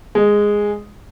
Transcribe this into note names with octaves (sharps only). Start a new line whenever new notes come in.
G#3